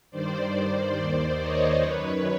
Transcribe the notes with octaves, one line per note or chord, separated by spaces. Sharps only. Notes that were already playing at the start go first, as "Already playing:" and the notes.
G2 D#3 C5 D5
D#2 D#3 C5 D5
C#5 D#5
F#2 D#3 B4 C#5